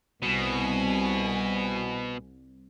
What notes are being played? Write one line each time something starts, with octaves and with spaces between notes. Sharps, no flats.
C2 B2 G#5